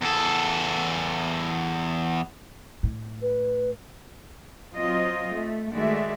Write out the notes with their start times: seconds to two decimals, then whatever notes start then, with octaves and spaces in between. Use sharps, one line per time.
0.01 E2 A4
2.83 A2
3.22 B4
4.75 F#3 C4 F4 D#5
5.32 A3
5.72 D#3 G#3 A3 F#4 D5 E5